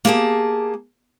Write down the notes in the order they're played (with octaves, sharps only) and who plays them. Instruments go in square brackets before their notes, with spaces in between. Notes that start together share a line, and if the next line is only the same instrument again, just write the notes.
[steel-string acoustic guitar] A#3 G4 G#4 A5